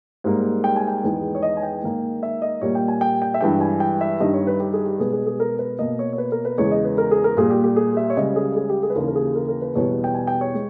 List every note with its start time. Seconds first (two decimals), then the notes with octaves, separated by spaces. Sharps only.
0.24 G#2 G3 A#3
0.64 G5
0.76 G#5
0.88 G5
1.04 E2 D#3 G#3 B3
1.35 C#5
1.42 D#5
1.57 G#5
1.63 G5
1.82 G#2 D#3 A#3
2.23 E5
2.42 D#5
2.62 A#2 G3 A#3 C#5
2.75 G5
2.88 G#5
3.01 G5
3.22 G5
3.34 E5
3.41 G2 E3 G#3 G5
3.61 G#5
3.80 G5
4.01 E5
4.20 G2 D#3 G3 D#5
4.34 C#5
4.47 B4
4.60 G4
4.73 G#4
4.86 G4
5.00 B2 G#3 B3 G#4
5.13 G#4
5.27 G#4
5.40 A#4
5.59 B4
5.79 B2 A#3 D#5
5.99 C#5
6.13 C#5
6.18 B4
6.32 A#4
6.45 B4
6.58 E2 C#3 G#3 C#5
6.71 D#5
6.85 B4
6.98 A#4
7.11 G#4
7.24 A#4
7.37 A#2 G3 A#3 G#4
7.50 G4
7.64 G4
7.76 G#4
7.97 E5
8.10 C#5
8.17 C#2 C#3 G3 D#5
8.36 G#4
8.56 G#4
8.70 G4
8.83 G#4
8.90 B4
8.96 D#2 C#3 E3 A#4
9.08 A#4
9.15 G#4
9.35 A#4
9.48 A#4
9.61 B4
9.75 E2 B2 G3 B3 C#5
10.04 G5
10.14 G#5
10.27 G5
10.41 C#5
10.54 G#3